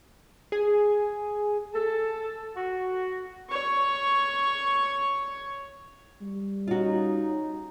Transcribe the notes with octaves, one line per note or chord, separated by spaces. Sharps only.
G#4 G#5
A4
F#4
C#5 C#6
G3
C#4 D#4 F4 F#4